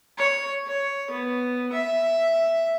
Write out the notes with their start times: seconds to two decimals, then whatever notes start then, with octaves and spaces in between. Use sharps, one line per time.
0.18 C#5
0.67 C#5
1.11 B3
1.73 E5